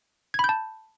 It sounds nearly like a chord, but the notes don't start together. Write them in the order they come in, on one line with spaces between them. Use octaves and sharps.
G#6 B5 G6 A5